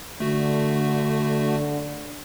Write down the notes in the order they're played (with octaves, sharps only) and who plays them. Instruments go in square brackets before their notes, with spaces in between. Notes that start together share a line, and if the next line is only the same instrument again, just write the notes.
[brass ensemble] D3 [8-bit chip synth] A3 F#4